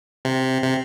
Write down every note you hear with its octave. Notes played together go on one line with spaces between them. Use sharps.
C3
C3